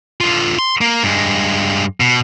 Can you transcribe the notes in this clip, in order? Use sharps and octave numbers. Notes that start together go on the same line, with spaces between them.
D3 F4
C6
A#3
G2 G#3
B2